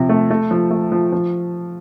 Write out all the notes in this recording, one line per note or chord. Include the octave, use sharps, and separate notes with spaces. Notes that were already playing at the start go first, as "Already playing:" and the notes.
Already playing: C3 F3
A3
A3
F3
A3
F3
F3